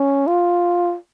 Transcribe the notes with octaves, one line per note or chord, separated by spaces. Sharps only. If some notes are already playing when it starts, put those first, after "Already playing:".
Already playing: C#4
F4